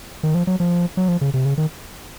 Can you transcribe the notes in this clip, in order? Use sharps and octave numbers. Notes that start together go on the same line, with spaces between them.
D#3
F3
F#3
F3
F#3
F3
C#3
C3
C#3
D#3